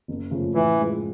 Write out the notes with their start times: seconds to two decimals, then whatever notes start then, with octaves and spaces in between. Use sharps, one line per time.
0.08 F#1
0.31 F2 C#3 F3 A3
0.54 A2 E3
0.77 F3 G#3